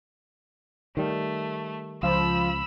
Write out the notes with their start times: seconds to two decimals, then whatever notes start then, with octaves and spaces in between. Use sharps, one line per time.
0.97 D#3 G3 A3
2.03 C#2 F3 B5 E6